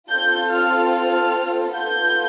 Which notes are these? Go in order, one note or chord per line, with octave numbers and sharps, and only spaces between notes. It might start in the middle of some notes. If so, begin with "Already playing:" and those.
C4 F4 A4 G6
F6
F6
B3 F4 A4 G6